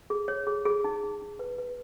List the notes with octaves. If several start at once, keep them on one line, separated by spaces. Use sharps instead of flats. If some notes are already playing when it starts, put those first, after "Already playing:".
G#4
C#5
G#4
G#4
D#4
D#4
D#4
B4
B4